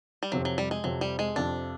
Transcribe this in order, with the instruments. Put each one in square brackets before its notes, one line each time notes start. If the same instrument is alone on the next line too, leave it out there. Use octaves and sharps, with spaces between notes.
[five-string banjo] G3
[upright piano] F2 C3 F3 [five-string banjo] F#3
[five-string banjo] F#3
G3
G#3
[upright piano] F2 C3 F3 [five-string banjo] F#3
[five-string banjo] G3
G#3
[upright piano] F2 C3 F3 [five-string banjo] D4